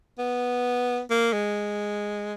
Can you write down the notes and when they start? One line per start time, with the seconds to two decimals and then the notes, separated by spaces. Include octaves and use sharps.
0.18 B3
1.10 A#3
1.33 G#3